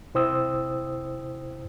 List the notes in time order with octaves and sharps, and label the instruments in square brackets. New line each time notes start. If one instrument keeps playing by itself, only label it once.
[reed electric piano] C3 E4 C5 G5 D#6 E6